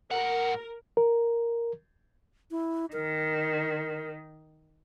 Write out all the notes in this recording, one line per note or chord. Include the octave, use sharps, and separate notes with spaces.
A2 A#4 F#5
A#4
E4
D#3 A#4